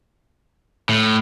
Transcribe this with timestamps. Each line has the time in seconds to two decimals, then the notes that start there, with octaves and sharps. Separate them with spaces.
0.89 A2